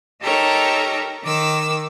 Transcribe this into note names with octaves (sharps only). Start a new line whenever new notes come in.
D#4 G4 A4 A#4 C#5 A#5
D#3 D6 E6